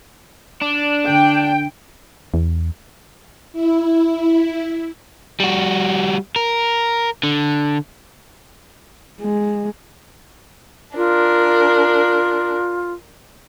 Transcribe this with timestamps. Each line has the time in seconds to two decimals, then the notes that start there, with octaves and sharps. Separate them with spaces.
0.61 D4
1.07 D3 G5
2.34 E2
3.53 E4
5.40 G3 F#4
6.36 A#4
7.23 D3
9.21 G#3
10.96 D4 F4 A#4